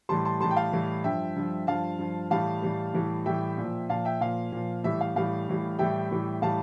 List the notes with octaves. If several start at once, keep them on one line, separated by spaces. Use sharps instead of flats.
A2 E3 G3 A5 C6
A5 C6
A2 E3 G3 A5 C6
G5
F5 A5
A2 E3 G3
G2 F3 E5 G5
G2 F3
G2 F3 F5 A5
G2 F3
A2 E3 G3 F5 A5
A2 E3 G3
A2 E3 G3
A2 E3 G3 E5 G5
A#2 F3
A#2 F3 F5 A5
E5 G5
A#2 F3 F5
A#2 F3
A2 E3 G3 E5
F5
A2 E3 G3 F5
A2 E3 G3
A2 E3 G3 E5 G5
A2 E3 G3
A2 E3 G3 F5 A5